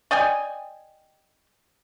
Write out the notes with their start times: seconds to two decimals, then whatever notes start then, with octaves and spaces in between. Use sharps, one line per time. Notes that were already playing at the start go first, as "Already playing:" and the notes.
0.11 D5 D#5 G5 G#5